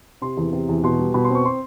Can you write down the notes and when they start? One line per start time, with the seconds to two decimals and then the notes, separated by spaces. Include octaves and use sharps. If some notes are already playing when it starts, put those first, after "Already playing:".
0.22 C3 C6
0.37 E2
0.53 C3
0.69 E2
0.84 B2 C6
0.99 G3
1.14 B2 B5
1.24 C6
1.30 C4 C#6
1.45 C6